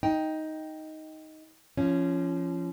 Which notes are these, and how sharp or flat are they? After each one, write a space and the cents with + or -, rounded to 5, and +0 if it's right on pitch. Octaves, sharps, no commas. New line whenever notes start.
D#4 +10 G5 +0
F3 -25 C#4 +0